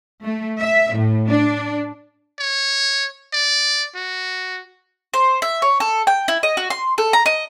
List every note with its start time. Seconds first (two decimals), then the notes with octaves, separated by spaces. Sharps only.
0.22 A3
0.60 E5
0.94 A2
1.29 D4
2.39 C#5
3.33 D5
3.95 F#4
5.14 C5
5.42 E5
5.62 C#5
5.80 A4
6.07 G5
6.28 E4
6.43 D#5
6.57 F#4
6.70 C6
6.98 A4
7.13 A#5
7.26 D#5